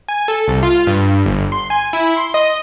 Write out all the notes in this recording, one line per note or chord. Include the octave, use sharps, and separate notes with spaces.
G#5
A4
C2
F4
G2
G1
C6
G#5
E4
C6
D#5